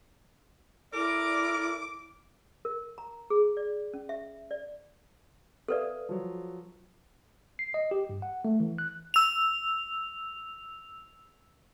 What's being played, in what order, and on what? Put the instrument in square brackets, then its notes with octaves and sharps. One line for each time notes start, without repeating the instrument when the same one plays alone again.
[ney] E4 [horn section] A4 A#4 D5 [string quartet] D6
[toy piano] A#4
A#5
G#4
D5
C#4
E5
D5
[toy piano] A4 B4 D5 [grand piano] E5 F5 D#6
[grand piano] F3 F#3
[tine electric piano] C7
D#5
G4
G2
F#5
A3
E3
F#6
[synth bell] E6 F7